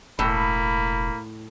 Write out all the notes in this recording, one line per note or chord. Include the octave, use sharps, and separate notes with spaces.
E1 A2 A#3 B5